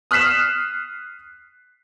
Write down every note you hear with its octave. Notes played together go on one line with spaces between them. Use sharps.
D#6 F6 F#6 B6 C7 E7